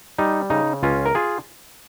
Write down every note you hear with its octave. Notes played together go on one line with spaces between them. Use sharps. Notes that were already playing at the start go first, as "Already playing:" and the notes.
G3 D#4
C#3 D#4
C#2 C#4 F4
A#4
F4 G#4